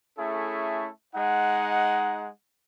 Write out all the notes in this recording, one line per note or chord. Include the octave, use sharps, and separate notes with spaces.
A3 C#4 E4 G#4 A4
G#3 D#4 F#5